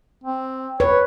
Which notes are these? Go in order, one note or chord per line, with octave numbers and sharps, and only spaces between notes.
C4
B4 C#5